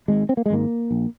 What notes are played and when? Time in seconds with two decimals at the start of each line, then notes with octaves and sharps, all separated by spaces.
0.08 G#1 G#2 G#3
0.29 C4
0.37 A#3
0.46 G#3
0.50 G#1 G#2 A#3
0.91 A#1